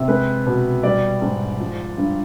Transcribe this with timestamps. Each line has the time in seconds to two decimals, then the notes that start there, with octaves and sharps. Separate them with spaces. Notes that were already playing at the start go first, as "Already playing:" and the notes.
Already playing: C3
0.08 G#3 B4
0.46 B2
0.83 G3 D5
1.22 G#2
1.60 F3
1.98 G2